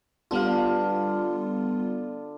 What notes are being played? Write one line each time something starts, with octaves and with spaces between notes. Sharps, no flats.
D3 G3 B3 F4 F5